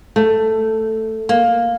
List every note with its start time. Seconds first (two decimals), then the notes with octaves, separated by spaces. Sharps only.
0.16 A3
1.29 A#3